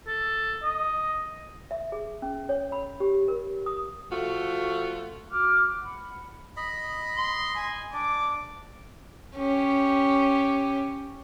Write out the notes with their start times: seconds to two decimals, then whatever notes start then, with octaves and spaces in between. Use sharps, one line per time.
0.07 A4
0.63 D#5
1.71 E5
1.92 G#4
2.22 C#4
2.49 C#5
2.72 B5
3.00 G4
3.28 A#4
3.66 D#6
4.11 F3 A3 F4 F#4
5.31 F#4 D6 F6 F#6
5.82 F#5 B5
6.57 D#5 B5
7.17 C6
7.56 G#5
7.93 D4 D5 D6
9.37 C#4 G4